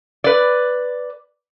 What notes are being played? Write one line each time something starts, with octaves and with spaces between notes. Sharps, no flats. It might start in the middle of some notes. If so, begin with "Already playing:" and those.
B4 D5